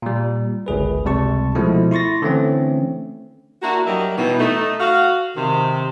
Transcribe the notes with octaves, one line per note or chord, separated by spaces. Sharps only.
A#2 G3
G1 C#2 G#4 B4
C#2 C3 G3 A5 C#6
B2 F3 G#3 A3 E4
E4 C6 C#6 A6 A#6
D3 E3 A3 C4 C#4
A#3 D4 E4 F#4
F#3 G3 G4 A#4 D#5 E5
B2 E3 D#4
A3 D#4
F#4 F5
C3 D#3